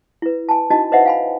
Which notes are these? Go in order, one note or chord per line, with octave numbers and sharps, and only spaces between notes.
E4 B4
G#5 A5
C#4 D#4 E4 F#4 D#5 A5
B4 C5 D#5 E5 F#5
F5 G#5 B5